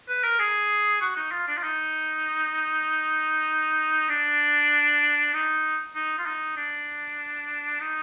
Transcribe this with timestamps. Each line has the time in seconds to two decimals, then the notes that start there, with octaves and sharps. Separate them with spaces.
0.08 B4
0.23 A#4
0.39 G#4
1.01 F#4
1.16 D#4
1.31 F4
1.47 D4
1.57 F4
1.63 D#4
4.09 D4
5.33 D#4
5.95 D#4
6.18 F4
6.26 D#4
6.56 D4
7.80 D#4